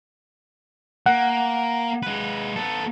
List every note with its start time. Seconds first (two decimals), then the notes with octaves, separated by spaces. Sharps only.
1.06 A#3 F#5
2.03 G#3 B4
2.56 B3 A4